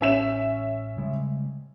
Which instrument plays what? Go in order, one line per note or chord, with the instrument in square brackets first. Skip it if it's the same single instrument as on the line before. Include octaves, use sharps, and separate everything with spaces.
[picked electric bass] A1 [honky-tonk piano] C#4 E5 E7
[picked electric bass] C#3 G3 G#3